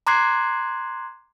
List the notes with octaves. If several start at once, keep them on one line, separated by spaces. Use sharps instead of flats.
A#5 C6 D6 F#6 G#6 C7